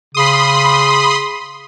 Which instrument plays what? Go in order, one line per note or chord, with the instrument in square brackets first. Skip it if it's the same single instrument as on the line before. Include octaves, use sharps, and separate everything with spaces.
[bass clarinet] C#3 [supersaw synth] B5 C6 D#6